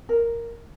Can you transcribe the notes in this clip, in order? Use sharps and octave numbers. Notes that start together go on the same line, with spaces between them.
A#4